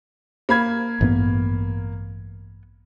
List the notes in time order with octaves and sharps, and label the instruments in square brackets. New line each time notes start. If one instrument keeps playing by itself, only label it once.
[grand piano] A#3 B5 G#6
[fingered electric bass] A1 G2 B3